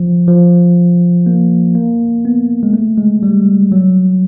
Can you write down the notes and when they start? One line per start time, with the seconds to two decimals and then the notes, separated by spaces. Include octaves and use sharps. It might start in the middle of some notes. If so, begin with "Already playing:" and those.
Already playing: F3
0.28 F3
1.26 A#3
1.75 A#3
2.25 B3
2.63 G#3
2.73 A3
2.98 G#3
3.23 G3
3.72 F#3